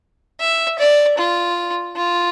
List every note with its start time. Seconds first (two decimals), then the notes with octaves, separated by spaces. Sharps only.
0.40 E5
0.79 D5
1.17 F4
1.96 F4